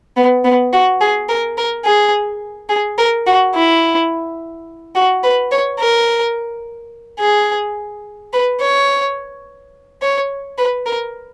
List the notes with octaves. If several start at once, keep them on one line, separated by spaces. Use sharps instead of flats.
B3
B3
F#4
G#4
A#4
A#4
G#4
G#4
A#4
F#4
E4
F#4
B4
C#5
A#4
G#4
B4
C#5
C#5
B4
A#4